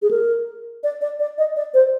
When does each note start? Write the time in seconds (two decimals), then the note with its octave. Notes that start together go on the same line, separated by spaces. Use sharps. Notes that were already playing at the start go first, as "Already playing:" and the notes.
0.02 G#4
0.11 A#4
0.84 D5
1.01 D5
1.20 D5
1.38 D#5
1.56 D5
1.74 C5